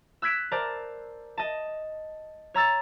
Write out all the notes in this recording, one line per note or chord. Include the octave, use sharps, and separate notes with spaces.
E6 F#6 G#6 B6 D7 E7
A#4 C5 D5 A5
D#5 A5
C#5 A#5 E6 A6